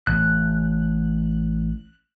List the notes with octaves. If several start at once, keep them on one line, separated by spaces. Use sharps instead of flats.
A1 F#6